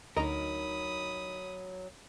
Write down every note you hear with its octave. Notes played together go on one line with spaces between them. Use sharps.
D2 F#3 D#4 A#4 D#5 A#5 B5 D#6